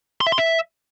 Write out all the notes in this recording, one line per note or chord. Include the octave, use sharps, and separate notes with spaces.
C6
E5
C6
E5